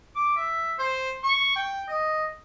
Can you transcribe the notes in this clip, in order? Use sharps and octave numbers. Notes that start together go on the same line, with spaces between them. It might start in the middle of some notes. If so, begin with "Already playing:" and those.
D6
E5
C5
C#6
G5
D#5